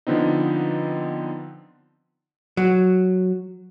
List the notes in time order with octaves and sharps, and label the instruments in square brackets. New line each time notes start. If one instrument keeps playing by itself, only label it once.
[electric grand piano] D3 F3 B3 C4 D#4
[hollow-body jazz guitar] F#3